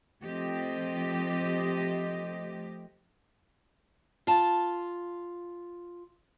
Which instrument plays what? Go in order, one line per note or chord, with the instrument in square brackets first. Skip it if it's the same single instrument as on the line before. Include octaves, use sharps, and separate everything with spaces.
[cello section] F3 A3 C4 G4 D#5
[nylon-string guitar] F4 A5